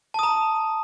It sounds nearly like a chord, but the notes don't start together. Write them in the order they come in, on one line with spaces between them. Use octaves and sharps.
A5 D#6 A#5